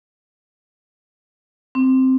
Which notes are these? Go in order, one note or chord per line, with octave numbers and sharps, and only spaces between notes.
C4